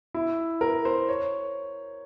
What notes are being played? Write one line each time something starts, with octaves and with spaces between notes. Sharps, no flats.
E4
A#4
C5
C#5